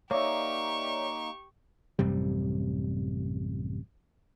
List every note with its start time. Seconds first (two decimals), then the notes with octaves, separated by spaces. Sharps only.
0.11 A#3 D#4 G4 C#5 D5 E5 C#6
1.99 A1 F#2 C3 G3